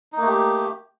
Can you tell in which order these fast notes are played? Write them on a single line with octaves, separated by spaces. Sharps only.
D#4 A#3 A3 G4